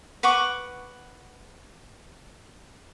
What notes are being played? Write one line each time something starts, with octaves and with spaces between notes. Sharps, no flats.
B4 F#5 C#6 D6